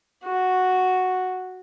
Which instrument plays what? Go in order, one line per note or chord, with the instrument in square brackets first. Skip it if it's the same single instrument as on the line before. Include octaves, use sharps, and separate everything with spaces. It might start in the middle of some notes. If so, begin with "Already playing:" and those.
[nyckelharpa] F#4